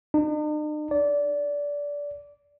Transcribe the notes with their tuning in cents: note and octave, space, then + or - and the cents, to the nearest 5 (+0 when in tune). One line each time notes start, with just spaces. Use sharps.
D#4 -45
D5 -20